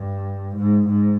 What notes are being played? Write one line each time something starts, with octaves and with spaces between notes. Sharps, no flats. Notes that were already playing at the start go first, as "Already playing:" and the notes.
Already playing: G2
G#2
G#2